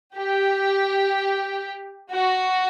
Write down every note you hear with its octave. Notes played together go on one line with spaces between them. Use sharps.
G4
F#4